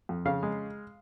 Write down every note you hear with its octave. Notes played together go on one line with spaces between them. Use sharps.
F2
C#3 F5
G#3